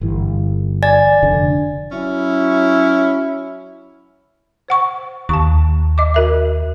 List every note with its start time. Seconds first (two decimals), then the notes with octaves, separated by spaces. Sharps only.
0.01 G1 E3
0.83 D5 G#5 A6
1.22 F1 D3 D4
1.90 F#3 C#4 E4
4.68 C5 F#5 C#6
5.29 D#2 A5 C#6
5.98 D#5 D6
6.14 F#4 A#4 E5